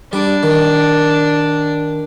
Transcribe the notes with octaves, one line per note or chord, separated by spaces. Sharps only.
G3 D4
D#3